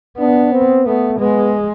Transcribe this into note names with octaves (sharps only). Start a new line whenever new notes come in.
B3 D4
C4
A3 B3
G#3 B3